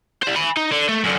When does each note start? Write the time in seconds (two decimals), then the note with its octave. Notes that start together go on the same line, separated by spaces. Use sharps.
0.23 G3 C5
0.35 G#5 B5
0.57 D#4
0.72 D3
0.89 A3
1.04 F#2 D3